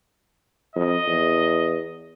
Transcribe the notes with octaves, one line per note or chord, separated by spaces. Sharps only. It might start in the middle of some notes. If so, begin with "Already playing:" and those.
F2 D#5
E2